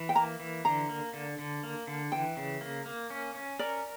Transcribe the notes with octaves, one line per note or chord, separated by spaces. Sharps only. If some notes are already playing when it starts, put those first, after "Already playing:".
Already playing: E3
G5
A#3 A#5
E3
D3 A#5
A#3
D3
D3
A#3
D3
E3 G5
C#3
A#3
A#3
C#4
C#4
A#4 D5